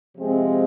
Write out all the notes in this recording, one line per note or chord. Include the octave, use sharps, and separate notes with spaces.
C3 F3 G#3 C4